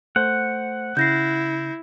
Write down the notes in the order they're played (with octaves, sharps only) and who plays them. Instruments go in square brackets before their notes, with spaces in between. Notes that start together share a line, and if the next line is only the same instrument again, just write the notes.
[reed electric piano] A3 C5 G6 [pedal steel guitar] F#5
[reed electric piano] C#3 [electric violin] E4 [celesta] G6 A#6 C7